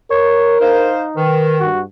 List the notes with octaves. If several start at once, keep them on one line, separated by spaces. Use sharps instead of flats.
A#4 C#5
D#4 C5 F5
D#3 B4
G2 F#4